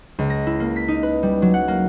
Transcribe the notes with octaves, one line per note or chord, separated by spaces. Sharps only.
C#2
A#6
E4
A#3
B6
D#4
B4
G3
F#3
F#5
A#3